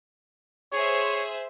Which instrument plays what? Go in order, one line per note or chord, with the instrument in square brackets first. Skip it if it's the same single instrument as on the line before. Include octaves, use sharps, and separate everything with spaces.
[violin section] G#4 C5 E5 [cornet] C#5